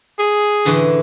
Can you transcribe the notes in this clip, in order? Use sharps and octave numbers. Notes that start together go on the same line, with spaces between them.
G#4
A2 D3 E3